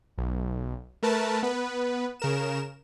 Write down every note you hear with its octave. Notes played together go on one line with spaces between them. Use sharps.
B1
A3 A#4 B4 A5
B3 B4
C#3 A#4 E7